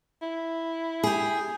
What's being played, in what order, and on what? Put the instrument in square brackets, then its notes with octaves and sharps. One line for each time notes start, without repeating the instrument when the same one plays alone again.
[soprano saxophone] E4
[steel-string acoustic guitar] G4 G#4